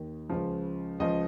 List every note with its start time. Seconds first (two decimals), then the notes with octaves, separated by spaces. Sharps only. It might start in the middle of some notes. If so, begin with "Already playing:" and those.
Already playing: D#2 D#3
0.29 C#2 C#3 F3
0.99 C#2 C#3 F3 D#5